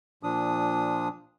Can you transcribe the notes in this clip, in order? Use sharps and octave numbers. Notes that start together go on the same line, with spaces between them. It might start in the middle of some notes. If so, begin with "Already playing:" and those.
A#2 F3 D4 D#6